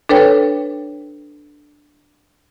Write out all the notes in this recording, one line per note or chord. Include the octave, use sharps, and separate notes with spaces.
D4 A4 B4 C#5 G5